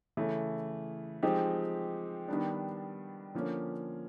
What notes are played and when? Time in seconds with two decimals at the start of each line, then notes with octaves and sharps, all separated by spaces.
0.17 C#3 E3 A3
1.23 F3 G#3 C4 D#4 G4
2.28 D#3 G3 B3 D4
3.34 D3 F3 A#3 C#4